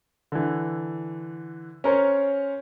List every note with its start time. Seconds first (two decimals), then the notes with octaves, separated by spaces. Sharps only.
0.32 D3 E3
1.84 C#4 A#4 C5 C#5